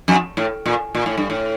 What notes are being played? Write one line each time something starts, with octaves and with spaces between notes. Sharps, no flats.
F2
A2
A#2
A#2
A2
G2
A2